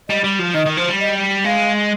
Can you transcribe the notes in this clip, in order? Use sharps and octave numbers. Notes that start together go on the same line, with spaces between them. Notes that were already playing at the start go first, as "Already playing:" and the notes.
G3 D#5
G3
F3
D#3 D#5
D#3
F3
G3
D#5
G#3 F5